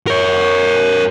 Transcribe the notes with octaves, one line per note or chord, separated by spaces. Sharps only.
A#4 C#5